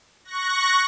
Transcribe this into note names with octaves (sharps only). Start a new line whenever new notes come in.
C#6 F#6 A#6